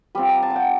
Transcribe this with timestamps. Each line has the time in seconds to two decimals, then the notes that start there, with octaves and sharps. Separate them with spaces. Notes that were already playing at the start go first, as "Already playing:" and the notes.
0.15 G3 C4 F4 B5
0.29 A#5
0.43 A5
0.50 F#5
0.56 G5